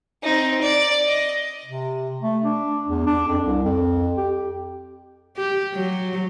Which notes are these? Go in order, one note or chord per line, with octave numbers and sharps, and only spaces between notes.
C4 D#4
D5
D#5
C3
A3
D4
E2
D4
F2
C2
F2
G4
G4
F#3